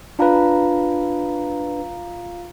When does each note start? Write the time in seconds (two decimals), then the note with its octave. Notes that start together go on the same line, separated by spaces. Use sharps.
0.19 D4 F4 B4 F5 A#5